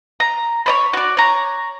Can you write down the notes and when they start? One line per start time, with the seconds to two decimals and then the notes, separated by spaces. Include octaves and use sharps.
0.20 A#5
0.66 C#5 D5 B5
0.93 F#4 D5
1.17 C#5 A#5